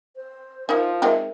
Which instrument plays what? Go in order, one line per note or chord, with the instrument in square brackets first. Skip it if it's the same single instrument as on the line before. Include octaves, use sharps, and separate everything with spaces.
[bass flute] C5
[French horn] F3 [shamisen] D#4 E4 [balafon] A#4
[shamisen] G#3 C4 D#4 [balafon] A#4 E5